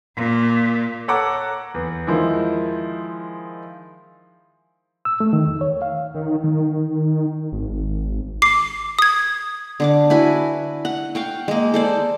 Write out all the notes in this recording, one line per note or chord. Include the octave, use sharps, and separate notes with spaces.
A#2
A4 C#5 F#5 A#5 D6 F#6
E2
D#3 F3 G#3 E4
E6
A3
D#3
E2
C#5
F5
D#3
D#3
G#1
D6 C7
D#6 G#6
D3 D4 D6
E4 F#4 B4 G#5
F#5
F5 G5 C#6
G#3 A#3
A4 C5 D5